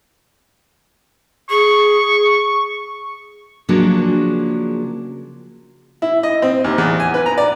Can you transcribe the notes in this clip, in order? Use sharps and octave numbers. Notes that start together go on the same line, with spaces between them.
G#4 C#6
C#3 F3 F#3 A#3 D4 G#4
E4
D#5
C4
D#2
E2
G#5
B4
A#5
D5